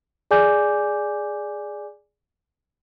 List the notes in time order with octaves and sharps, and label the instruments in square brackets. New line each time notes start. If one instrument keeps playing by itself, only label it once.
[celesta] G#4 D5 G#5 D6 G6